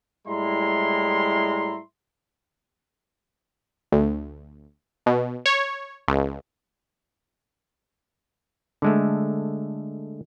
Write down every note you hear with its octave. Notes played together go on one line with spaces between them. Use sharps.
A2 G3 G#3 E4 A#5 C6
D2
B2
C#5
C#2
D3 G#3 A3